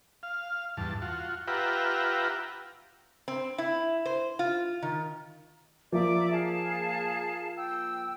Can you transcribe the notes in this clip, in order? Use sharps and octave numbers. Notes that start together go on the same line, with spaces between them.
F5
E2 G2 A5
F4 F#4
F4 G4 B4 E5 F#5 A#5
C4
E4
C5
F4
D#3
F3 A#3 D5 E5 D6
G#4 F5 A5
G5 E6